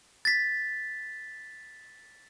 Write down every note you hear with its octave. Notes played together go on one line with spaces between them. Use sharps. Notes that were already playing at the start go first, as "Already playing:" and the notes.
A6 B6